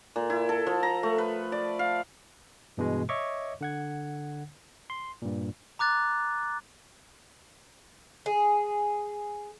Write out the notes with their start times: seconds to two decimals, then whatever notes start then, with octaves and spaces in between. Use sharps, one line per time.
0.16 A#2
0.30 E4
0.49 A4
0.67 F3
0.83 A#5
1.03 A3
1.18 B4
1.52 D5
1.79 F5
2.77 G2 B2 E3 G#3
3.09 C#5 D#5 E5 C#6 D6
3.61 D3 F#5 G#6
4.90 C6
5.22 G2 A#2
5.79 A#5 D6 F#6 A6
8.26 G#4